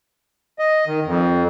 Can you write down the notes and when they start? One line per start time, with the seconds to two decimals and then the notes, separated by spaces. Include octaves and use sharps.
0.59 D#5
0.87 D#3
1.05 F2